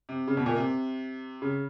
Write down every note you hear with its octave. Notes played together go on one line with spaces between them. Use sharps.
C3
C#3
B2
A#2
C3
C#3